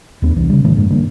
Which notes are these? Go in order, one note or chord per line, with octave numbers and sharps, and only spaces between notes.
D#2 A3 B3 D4
C2 E3 D4
C#3 G3
A2 D3 E3 A3
G2 G#3 A#3 D4
D3 G3 A#3